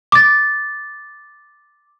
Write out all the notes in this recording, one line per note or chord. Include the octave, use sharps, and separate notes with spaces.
D6 A6